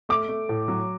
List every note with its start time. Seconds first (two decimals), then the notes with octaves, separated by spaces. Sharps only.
0.09 A3 D6
0.29 A3
0.49 A2
0.68 F#3